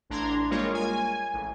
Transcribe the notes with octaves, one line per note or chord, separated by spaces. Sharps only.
A1 D4 A#5 C6 G#6
G3 G#3 A#3 F4 A#4 C#5
G#5
A1